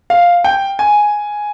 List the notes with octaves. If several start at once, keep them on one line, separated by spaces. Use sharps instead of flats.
F5
G5
G#5